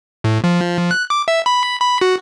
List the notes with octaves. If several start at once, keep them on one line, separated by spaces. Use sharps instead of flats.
A2
F3
F#6
D6
E5
B5
B5
F#4